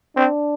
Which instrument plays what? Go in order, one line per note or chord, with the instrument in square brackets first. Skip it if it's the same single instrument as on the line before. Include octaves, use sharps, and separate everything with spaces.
[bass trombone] C4 [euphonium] D4